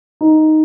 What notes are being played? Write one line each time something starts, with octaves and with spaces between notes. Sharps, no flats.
D#4